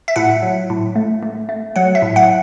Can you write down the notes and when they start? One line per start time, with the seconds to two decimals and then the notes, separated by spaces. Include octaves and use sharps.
0.08 E5
0.16 A2 F#5
0.42 F#3
0.70 A2
0.96 A3
1.23 A3
1.49 A3
1.76 F#3 F#5
1.95 E5
2.02 A2
2.16 F#5